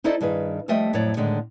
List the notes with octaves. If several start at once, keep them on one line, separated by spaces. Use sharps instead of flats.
D#4 E4 A4 C5 D5 D#5
G2 D#3 G#4 B4
F3 G3 A3 D#5 E5 G5
F2 A2 F#3 C#5 D5
A2 D3 D#3 G#3